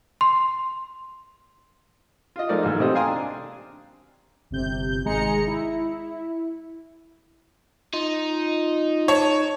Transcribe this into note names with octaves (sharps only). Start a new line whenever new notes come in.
C6
F4 D#5
F3 G#3 A3 D#4 A#4 D5
G#2 E3 F#3 A#3
A1 C3 C4 A4 D#5
F5 G5 G#5 A#5 C6 D#6
D4
G1 C3 G6
G#1 G#3 G#4 A#5 C#7
E4
D#4 F4
C#5 A5